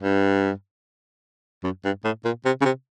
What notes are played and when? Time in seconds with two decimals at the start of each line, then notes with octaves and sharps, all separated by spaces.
0.02 G2
1.64 F#2
1.85 G2
2.04 A2
2.25 A#2
2.45 C3
2.61 C#3
2.65 C3